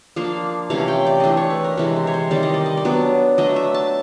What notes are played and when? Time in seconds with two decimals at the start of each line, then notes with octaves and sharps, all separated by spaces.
0.16 F3 A#3 D4 F5
0.70 C3 E3 A3 C#4 F5
0.88 G5
1.07 D5
1.20 E3 A3 D4 D5 D#5
1.37 C#5
1.50 B4
1.64 A#4
1.77 C3 E3 G#3 B4
1.96 C5
2.07 C#5
2.14 C5
2.31 D#3 G3 C4 D5
2.43 D#5
2.54 D5
2.66 D#5
2.77 D5
2.85 F#3 B3 D4
3.38 F#3 A3 D4 D#5
3.56 E5
3.74 A5